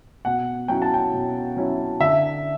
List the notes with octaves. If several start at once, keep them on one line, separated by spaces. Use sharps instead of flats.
B2 F#5
F#3 C#4 E4 G5
A5
G5
B2
F#3 C#4 E4
D3 E5